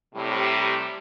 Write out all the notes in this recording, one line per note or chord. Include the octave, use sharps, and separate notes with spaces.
A2 C3 G3